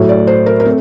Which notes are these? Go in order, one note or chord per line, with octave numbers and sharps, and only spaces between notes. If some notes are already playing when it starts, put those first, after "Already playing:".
Already playing: A2 F#3 A3
D5
C5
A#4
A#4
A3 C4 A4